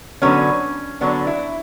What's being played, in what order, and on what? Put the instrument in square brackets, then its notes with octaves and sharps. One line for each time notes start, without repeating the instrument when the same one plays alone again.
[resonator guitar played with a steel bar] D3 F#3 B3 C#4
D3 F#3 B3 D4
E4